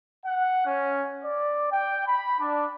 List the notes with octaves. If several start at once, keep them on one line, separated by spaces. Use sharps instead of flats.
F#5
C#4
D5
G5
B5
D4